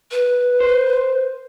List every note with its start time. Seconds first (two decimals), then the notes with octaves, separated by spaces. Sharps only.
0.11 B4
0.60 C5